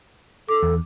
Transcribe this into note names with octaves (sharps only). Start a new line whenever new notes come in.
A4 D6
E2